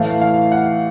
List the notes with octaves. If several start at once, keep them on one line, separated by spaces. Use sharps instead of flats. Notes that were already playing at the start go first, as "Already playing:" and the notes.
Already playing: A2 E3 A3 F5
F5
F#5